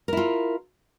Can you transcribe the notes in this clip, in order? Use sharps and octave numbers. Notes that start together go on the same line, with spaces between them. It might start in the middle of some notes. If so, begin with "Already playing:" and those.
E4 F4 A#4